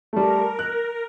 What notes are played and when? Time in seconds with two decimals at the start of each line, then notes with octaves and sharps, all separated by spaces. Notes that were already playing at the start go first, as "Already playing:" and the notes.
0.13 G3 A3 A#4
0.59 F#6